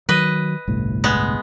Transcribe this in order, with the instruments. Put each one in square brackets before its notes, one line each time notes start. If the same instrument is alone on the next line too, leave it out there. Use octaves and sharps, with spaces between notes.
[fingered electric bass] D#3 F#3 [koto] B4 D#5
[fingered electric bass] G1 C2 A2
[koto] G#3 B3